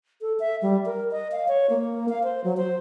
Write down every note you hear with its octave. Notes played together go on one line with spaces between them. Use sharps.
A4
E5
G3
A#4
D#5
F5
C#5
A#3
F5
C5
F#3
C5